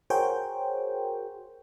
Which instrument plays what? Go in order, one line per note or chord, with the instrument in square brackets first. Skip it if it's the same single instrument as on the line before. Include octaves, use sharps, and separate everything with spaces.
[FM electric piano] F#4 G#4 A#4 C5 C#5 G5